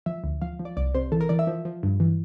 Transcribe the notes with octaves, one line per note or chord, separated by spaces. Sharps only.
F3 E5
D2
F3 F5
F3
D5
C2 D5
C3 C5
E3 A4
A#4
E3 D5
E5
F3
F3
G2
E3